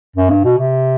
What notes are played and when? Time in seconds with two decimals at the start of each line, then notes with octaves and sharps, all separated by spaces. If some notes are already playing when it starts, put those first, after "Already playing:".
0.16 F#2
0.30 G2
0.44 B2
0.58 C3